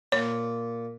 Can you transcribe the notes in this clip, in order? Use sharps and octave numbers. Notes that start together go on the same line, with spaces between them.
A#2 C#5